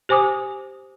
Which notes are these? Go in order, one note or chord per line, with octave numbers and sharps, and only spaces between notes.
G4 C5 G#5 D6 D#6